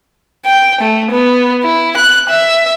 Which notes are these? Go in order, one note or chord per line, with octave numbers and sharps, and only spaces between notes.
G5
A3
B3
E4
F#6
E5